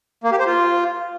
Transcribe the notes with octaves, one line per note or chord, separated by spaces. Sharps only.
A#3
G4
C5
F4